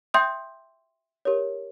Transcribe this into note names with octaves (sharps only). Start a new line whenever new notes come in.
E5 G5 C6 D#6 G6
G4 A#4 C#5